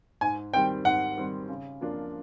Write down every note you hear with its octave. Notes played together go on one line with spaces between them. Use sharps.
G#2 G#5
D#3 G3 C4 G5
G#2 F#5
D#3 G3 C4
C#3
F3 A#3 D4 F4